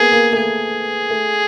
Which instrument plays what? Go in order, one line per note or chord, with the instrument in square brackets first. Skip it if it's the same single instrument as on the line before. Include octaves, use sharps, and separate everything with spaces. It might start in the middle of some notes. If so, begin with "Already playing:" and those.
Already playing: [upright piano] A#3 B3 [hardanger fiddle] G#4
[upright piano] A#3
A3
[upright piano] A#3 [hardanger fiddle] G#4
[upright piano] A3